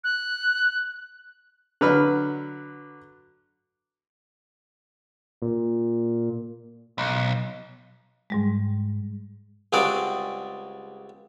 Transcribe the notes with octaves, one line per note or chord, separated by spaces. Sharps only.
F#6
D3 F#3 B4 B5 F6
A#2
B1
G#2 G3 G#3
C#2 G3 C4 F#4 G#4 D5